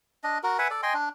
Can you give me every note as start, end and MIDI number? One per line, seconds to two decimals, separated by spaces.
0.24 0.38 62
0.24 0.38 75
0.43 0.58 66
0.43 0.58 70
0.59 0.68 71
0.59 0.68 76
0.59 0.68 78
0.59 0.68 80
0.70 0.81 69
0.70 0.81 74
0.83 0.94 75
0.83 0.94 79
0.83 0.94 80
0.83 0.94 84
0.94 1.09 62